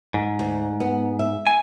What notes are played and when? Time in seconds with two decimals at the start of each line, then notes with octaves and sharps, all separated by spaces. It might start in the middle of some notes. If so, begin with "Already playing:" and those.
0.14 G#2
0.39 D2
0.80 B3
1.19 E5
1.47 G#5